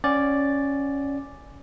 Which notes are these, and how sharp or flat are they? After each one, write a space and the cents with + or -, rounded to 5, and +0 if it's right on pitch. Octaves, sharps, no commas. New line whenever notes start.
C#4 +0 D5 +0 F#5 +35